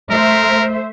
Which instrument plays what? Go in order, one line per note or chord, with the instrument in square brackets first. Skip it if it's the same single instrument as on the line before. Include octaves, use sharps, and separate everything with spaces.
[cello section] A3 C5 E5 [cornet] A#4